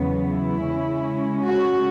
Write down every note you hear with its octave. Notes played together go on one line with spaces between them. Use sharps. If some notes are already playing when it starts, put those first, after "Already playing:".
Already playing: E2 C#3 F#3 B3
E4
C#3 G#3 C#4
F#4